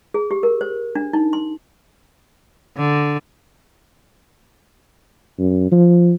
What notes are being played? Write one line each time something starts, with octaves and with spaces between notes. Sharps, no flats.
G#4
G4
A#4
C5
D4
D#4
C6
D3
F#2
F3